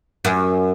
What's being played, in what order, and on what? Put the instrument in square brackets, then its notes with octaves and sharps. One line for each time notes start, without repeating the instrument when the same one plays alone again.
[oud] F#2